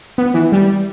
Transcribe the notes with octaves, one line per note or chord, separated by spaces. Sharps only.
B3
E3
G3